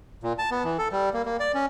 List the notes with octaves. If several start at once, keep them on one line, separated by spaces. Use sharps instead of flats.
A#2
A5
B3
E3
A4
G3
A#3
A#3
D5
C#4